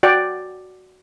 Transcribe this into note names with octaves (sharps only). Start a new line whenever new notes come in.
F#4 D5 G5